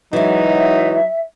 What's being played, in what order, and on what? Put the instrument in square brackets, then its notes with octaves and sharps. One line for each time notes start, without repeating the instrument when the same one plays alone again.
[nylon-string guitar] E3 G#3 [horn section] F#3 D#4 [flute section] E5